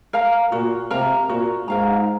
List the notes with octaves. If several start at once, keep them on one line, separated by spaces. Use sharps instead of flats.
A#4 F5 A#5
A#2 F#4
C3 A#4 F5 A#5
A#2 F#4
G#2 A#4 F5 A#5